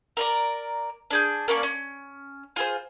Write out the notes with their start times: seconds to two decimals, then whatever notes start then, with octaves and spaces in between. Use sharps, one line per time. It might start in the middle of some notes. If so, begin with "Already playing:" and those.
0.17 A#4 D5 A#5
1.10 D4 G#4 G6
1.48 A#3 C#4 D5 C#6
1.63 C#4
2.56 F4 G#4 C5